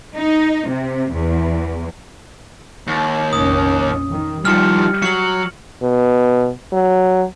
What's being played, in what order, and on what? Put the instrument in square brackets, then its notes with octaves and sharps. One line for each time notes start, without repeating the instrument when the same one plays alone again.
[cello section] D#4
C3
E2
[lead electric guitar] D#2
[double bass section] F1 A#1 C#4 [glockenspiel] D#6
[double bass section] D#3
[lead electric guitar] D#3 F3 [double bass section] G3 [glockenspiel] F6 C#7
[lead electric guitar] F#3 [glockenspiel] C#7 F#7
[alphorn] B2
F#3